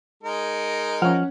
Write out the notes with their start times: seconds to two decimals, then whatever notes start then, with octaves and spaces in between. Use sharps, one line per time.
0.23 G#3 D#4 A#4
1.02 F3 C#4 F#5 F6